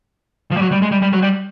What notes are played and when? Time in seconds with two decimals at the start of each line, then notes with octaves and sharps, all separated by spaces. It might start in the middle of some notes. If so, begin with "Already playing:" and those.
0.51 F3
0.57 G3
0.61 F#3
0.72 G3
0.82 G#3
0.92 G3
1.02 G3
1.13 F#3
1.22 G3